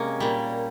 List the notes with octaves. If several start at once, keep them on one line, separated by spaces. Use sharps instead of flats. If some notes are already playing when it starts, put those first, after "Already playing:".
Already playing: C3 G#3 A#3 C#4
A#2 G3